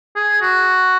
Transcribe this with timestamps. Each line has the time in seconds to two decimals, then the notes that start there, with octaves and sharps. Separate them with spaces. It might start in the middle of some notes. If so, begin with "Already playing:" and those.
0.16 G#4
0.42 F#4